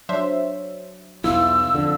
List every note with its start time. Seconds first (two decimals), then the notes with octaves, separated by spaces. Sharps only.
0.09 F#3 D4 C5 E5
1.24 B1 E2 E4 F4 E6
1.74 F2 D3